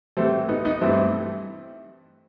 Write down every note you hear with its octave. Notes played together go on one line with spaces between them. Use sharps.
A2 E3 G3 A3 C4
B3 D#4
B3 D#4
G2 E3 A3 C4 E4